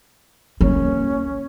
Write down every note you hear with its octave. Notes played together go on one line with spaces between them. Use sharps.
A#3 C#4